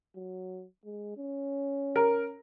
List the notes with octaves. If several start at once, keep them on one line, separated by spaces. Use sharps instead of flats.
F#3
G#3
C#4
A#4